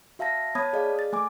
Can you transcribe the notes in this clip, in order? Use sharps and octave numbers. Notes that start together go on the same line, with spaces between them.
F#4 E5 F5 A5 A#6
B3 C#5 A5 B5 D#6 G#6
G#4 D5 D#5 F5
A6
A3 G#5 D6